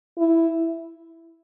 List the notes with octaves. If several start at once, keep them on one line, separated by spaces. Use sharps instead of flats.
E4